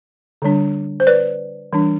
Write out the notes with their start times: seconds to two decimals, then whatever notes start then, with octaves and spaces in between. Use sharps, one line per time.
0.42 D3 G3 D4
1.00 C5
1.07 B4 D5
1.73 E3 G3 D4